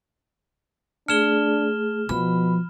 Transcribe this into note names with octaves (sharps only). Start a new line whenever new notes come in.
A3 D4 G#4 F6 E7 G7
B2 F3 B5